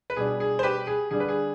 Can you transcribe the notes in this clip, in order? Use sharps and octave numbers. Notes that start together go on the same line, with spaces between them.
B4
B2 G3 D4 G#4
G#4
C5
G4 B4
G#4
D3 G3 D4 G#4
B4
G#4